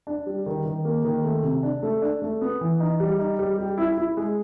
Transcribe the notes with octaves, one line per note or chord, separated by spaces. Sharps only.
D4
G3
D#3
D#3
A#3
D#3
A3
C3
D4
A3
D4
A3
B3
E3
D#4
G3
D#4
G3
G4
E4
E4
G#3